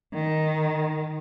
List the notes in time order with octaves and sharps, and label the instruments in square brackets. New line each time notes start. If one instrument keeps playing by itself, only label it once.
[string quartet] D#3